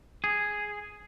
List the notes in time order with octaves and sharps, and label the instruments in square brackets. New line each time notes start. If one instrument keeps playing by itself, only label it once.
[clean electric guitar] G#4